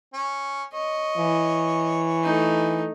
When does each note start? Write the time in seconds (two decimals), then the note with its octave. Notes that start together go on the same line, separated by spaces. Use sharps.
0.14 C#4
0.74 C#5 D#5
1.18 E3
2.24 A3 D#4